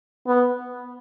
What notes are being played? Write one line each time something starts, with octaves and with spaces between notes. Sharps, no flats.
B3